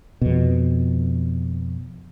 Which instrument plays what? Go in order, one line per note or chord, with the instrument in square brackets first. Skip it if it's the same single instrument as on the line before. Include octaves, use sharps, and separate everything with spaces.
[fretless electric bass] F2 B2